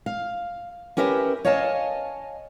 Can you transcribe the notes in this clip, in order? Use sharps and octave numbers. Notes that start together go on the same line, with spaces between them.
F5
C#4 G4 A#4 B4 E5
C#5 D#5 F5 G#5 A5